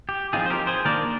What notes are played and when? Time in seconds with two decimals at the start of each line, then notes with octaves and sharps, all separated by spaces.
0.09 G4
0.33 F3 C4 D#4 F4 G#4
0.46 C5
0.50 G4 A#4
0.67 G#4 C5
0.85 D#3 A#3 D4 A#4 D5